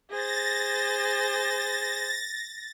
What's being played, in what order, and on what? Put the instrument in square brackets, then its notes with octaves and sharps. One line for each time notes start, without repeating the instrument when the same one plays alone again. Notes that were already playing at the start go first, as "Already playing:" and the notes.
[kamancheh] G#4 C5 [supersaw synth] A6 A#6